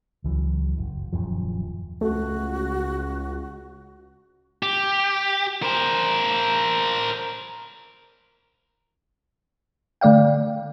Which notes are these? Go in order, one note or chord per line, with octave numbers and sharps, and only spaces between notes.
C#2 E3 F#3
F#1
D#1 F#2 F3
C#2 A3 F#4
G4
A#4 C5
D3 A3 D5 F5 G5